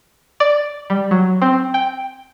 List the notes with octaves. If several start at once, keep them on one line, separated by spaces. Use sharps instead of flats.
D5
G3
F#3
C4
G5